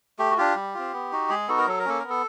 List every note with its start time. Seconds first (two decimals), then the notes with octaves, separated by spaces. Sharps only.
0.19 A3 G4
0.31 F#4
0.38 D4 F4 G4
0.55 G3
0.74 C4 F4
0.93 B3
1.12 D#4 F#4
1.30 G#3 G#4
1.48 B3 D#4 F#4 A4
1.58 A#4
1.67 F#3 A4
1.80 A#4
1.85 A#3 C#4 A4
1.99 B3 A#4
2.10 A4